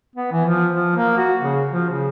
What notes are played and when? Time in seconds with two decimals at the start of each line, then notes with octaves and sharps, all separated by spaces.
0.16 B3
0.32 E3
0.45 F3
0.73 F3
0.96 A#3
1.17 F#4
1.40 C#3
1.72 F3
1.89 C#3